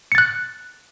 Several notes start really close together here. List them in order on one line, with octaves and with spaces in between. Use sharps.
C#7 A6 F#6